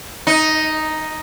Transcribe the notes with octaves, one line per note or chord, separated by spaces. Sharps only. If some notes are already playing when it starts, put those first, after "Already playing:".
D#4